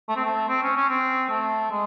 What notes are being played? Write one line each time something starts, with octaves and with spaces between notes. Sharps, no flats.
A3
C4
A3
C4
C#4
C#4
C4
A3
G#3